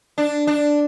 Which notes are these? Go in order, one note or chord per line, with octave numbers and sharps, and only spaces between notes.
D4
D4